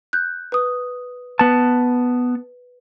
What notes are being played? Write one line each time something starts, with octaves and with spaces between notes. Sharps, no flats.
F#6 G6
B4 D#6
B3 B4 A5